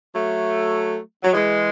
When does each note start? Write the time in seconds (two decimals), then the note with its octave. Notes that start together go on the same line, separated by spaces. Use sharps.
0.14 F#3 A3
1.23 F#3
1.32 E3 G#3